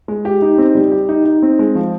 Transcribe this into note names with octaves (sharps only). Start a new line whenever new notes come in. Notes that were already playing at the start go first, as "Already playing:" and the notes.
G#3
G4
D#4
C4
G3
G4
D#4
D#4
C4
G#3
F3